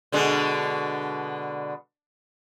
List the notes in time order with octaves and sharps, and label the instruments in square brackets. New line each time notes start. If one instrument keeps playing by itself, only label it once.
[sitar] B2 D3 G#3